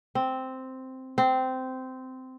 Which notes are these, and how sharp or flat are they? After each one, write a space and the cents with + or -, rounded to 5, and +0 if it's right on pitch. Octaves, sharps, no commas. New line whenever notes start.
C4 -5
C4 -15